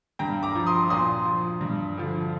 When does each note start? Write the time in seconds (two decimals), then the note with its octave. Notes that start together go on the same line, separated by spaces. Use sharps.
0.19 G2 G5 A#5
0.43 A#5 D6
0.55 F3
0.66 C6 D#6
0.90 A#2 C6 D#6
1.25 F3
1.61 G2
1.97 D3 F3